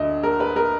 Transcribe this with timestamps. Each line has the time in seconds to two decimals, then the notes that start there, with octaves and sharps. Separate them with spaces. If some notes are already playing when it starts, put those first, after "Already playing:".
Already playing: D2 D3 D#5 E5
0.23 A#4
0.40 B4
0.56 A#4